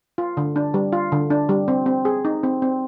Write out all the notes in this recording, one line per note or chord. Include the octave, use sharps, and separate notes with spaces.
F4
D3
D4
G3
F4
D3
D4
G3
C4
C4
G#4
D#4
C4
C4